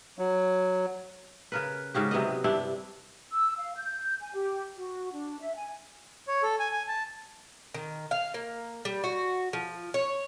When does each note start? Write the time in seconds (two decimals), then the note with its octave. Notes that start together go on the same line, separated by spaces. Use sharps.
0.19 F#3
1.52 C#3 A#4 B4
1.94 G#2 C#3 F#4 G4
2.11 C3 F#3 B3 D#5
2.44 G2 C3 D4 E4
3.32 E6
3.58 F5
3.76 G6
4.20 G#5
4.34 G4
4.76 F#4
5.12 D4
5.40 E5
5.55 G#5
6.28 C#5
6.42 A4
6.60 G#5
6.72 G#5
6.88 A5
7.74 D#3
8.11 F5
8.34 A#3
8.85 G3
9.04 F#4
9.53 F3
9.94 C#5